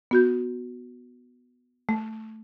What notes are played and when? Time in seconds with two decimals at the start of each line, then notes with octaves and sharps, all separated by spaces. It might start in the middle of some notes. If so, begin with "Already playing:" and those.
0.11 B3 F#4 G6
1.89 A3